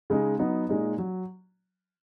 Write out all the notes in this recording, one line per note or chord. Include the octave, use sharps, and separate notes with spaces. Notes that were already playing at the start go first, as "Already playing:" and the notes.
C#3 G#3 D#4
F#3 B3 D#4
A#2 G#3 D#4
F#3